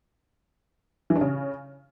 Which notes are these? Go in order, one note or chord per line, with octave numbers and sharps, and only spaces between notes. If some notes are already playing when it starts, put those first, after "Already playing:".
E3
D4
C#3